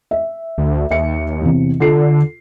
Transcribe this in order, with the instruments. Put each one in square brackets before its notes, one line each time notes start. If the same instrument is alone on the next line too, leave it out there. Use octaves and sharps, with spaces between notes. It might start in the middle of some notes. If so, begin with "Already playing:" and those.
[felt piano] E5
[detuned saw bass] D2
[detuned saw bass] D#2 [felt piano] E5 C#7
[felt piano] E2 C3
[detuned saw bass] D3 [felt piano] F4 A4 C7